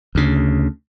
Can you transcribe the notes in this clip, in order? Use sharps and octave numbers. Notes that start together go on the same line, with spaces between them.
D2 C#3